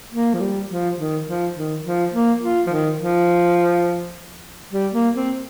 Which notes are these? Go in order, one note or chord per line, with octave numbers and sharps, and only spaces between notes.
A#3
F3
G3
F3
D#3
F3
D#3
F3
A#3
F4
F3
D#3
F3
G3
A#3
C4